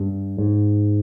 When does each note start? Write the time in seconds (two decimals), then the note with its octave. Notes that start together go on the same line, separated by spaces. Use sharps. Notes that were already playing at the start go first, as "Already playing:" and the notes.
Already playing: G2
0.38 G#2